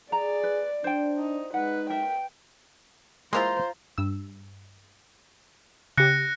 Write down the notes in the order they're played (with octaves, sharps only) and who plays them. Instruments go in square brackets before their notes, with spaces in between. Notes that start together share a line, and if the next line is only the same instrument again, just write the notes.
[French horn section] G#4 [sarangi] D5 [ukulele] A#5
[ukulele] B4
[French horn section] D4 [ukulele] C5 G5
[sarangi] D#4
[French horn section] G#3 D#4 [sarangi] B4 [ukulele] F#5
[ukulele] A#4 E5 [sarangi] G5
[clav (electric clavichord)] G#3 A#3 E4 [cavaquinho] F4 A#5 C6 [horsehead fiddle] C5
[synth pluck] G2 E6
[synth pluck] C#3 G4 [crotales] F#6 A#6 C#7